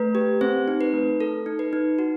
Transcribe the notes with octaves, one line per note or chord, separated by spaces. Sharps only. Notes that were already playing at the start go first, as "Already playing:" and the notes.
Already playing: A3 B4
G4
C4 C5
D#4
B4
A3
A4
D#4
B4
D#4
F#4